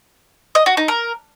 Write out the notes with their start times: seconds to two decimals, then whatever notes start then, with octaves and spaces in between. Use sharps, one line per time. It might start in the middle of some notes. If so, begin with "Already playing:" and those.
0.55 D#5
0.66 F#4
0.77 D#4
0.88 A#4